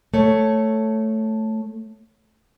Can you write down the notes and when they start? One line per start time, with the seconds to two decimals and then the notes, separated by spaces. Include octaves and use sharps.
0.14 A3 C#5